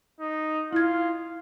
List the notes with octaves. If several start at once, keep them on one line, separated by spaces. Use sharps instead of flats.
D#4
E4 F4 G#6